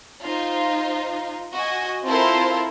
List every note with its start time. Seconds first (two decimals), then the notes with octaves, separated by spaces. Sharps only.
0.24 D#4 F4 C5
1.52 F#4 D#5 G#5
2.05 C4 E4 F4 A4 A#4 C5